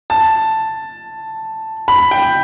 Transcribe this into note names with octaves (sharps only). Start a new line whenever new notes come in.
A5
B5
G5